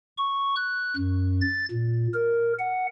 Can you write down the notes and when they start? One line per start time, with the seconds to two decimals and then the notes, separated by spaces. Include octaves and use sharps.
0.17 C#6
0.56 F#6
0.97 F#2
1.41 A6
1.71 A#2
2.14 A#4
2.59 F#5